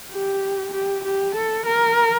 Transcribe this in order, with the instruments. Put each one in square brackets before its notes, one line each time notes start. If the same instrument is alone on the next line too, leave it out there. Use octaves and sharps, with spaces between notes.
[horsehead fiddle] G4
G4
G4
A4
A#4